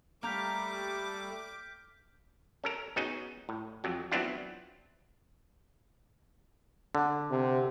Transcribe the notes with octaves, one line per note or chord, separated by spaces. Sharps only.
G3 A3 A#3 A#5 D6 F6 G6 B6
C#4 A4 A#4
B3 C#4 D#4 F#4 G#4
A2
F2 F#3
F#3 B3 C4 D4 E4 F4
D3
C3